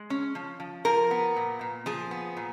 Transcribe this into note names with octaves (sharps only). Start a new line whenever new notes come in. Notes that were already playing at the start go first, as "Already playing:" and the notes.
Already playing: G#3
C#4
F3
F3
F3 A#4
B3
A#2
A#2
F3 G#4
B3
A#2